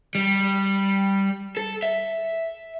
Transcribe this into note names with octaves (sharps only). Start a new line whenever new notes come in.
G3
A4
E5